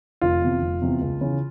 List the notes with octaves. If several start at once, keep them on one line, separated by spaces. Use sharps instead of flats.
F1 F4
E2 C3
F1
E2 C3
C#2
C#3 E3